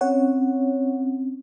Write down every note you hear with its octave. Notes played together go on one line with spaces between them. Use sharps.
C4 C#4 C#5 F#5